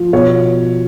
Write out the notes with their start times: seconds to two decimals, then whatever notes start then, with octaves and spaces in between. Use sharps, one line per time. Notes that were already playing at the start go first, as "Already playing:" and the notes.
Already playing: F3
0.13 B2 C#5